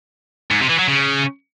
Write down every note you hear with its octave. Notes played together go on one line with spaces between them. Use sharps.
G#2
C3
E3
F#3
C#3